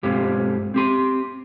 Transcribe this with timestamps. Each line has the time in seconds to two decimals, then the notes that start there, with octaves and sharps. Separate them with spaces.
0.03 B1 G2 G#3 C4 F4 G4
0.74 C4 G4 C6